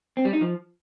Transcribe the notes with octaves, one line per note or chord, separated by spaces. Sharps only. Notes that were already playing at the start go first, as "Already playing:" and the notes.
C4
G3
D#4
F3